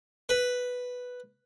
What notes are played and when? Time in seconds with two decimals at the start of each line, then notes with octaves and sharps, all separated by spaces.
0.29 B4